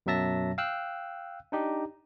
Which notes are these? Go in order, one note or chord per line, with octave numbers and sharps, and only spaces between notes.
F#2 B2 F#3 E5 A5 A#6
F5 G5 E6 F#6
D4 D#4 G4